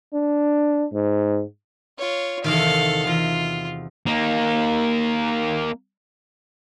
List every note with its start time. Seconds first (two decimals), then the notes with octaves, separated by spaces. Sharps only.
0.13 D4
0.94 G#2
1.99 F4 C#5
2.44 E2 C3 D#3 A4 F5
3.07 E2 F4
4.06 A#3 D#4